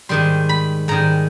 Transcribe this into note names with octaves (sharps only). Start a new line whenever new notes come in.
G#2 D#3 G3 C6
B5
G#2 D#3 G3 A#5